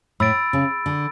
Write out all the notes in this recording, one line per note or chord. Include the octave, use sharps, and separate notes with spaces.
A2 B5 E6 A6 D7
C#3
D3